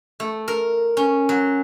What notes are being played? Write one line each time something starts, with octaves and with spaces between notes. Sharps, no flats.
A3
A#4
C#4
F#3